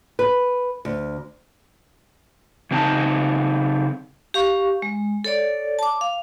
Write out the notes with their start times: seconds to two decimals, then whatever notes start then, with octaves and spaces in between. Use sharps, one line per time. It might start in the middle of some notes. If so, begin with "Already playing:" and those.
0.19 B4
0.85 D2
2.71 C#3 C4 D#4 G#5 A5
4.34 G4 F5 C#6
4.82 G#3
5.24 A4 C#5 D5
5.79 A5 D6
6.01 F5